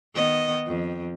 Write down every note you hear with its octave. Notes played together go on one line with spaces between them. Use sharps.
D#3 B3 D#5
F2